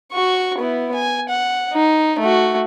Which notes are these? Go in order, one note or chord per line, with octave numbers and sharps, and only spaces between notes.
F#4 C#6
B3 E4
G#5
F#5
D#4
A3 F#4